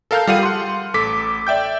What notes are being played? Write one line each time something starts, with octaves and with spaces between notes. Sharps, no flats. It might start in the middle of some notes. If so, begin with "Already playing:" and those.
A4 A#4 F5 A5 F6 G6
G3 F4 G#4 F5 F#5 D#7
F#5 C6
A1 A4 D6 B6
D5 E5 G5 G6